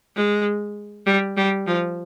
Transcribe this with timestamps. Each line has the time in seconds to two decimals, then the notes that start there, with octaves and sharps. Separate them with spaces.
0.16 G#3
1.07 G3
1.37 G3
1.67 F3